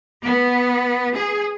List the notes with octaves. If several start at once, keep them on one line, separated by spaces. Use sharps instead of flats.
B3
G#4